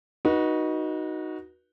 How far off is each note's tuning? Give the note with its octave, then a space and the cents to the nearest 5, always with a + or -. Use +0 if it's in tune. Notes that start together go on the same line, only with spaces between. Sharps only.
D#4 +0 F#4 +0 B4 -35